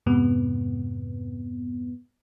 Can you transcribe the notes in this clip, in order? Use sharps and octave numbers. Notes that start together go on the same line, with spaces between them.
F2 G#2 C3 B3